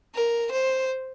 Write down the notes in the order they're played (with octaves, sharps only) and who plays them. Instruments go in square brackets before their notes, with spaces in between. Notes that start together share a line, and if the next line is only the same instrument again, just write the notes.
[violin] A#4
C5